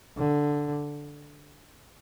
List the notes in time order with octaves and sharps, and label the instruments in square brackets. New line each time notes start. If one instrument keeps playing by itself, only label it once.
[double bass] D3